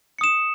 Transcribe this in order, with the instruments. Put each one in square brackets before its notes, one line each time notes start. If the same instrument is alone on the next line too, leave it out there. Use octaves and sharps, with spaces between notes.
[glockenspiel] C#7
D#6
E7